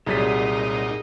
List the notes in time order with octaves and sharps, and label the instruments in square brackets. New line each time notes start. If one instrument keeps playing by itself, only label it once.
[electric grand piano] C2 F#3 B6 [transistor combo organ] A#2 D#4 [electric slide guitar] G4 G#4 D5